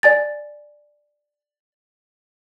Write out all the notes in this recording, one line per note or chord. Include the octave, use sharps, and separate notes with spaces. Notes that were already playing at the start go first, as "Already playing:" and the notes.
D5 G#5 A6